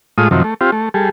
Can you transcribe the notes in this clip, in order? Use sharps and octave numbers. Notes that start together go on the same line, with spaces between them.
A2 G#3 F4 D#6
F#2 C3 D#3 F3
A3
C4 F4 G4
A3
G3 G#4 A4